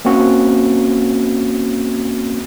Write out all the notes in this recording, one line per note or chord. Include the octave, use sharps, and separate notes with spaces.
A#3 C4 C#4 F#4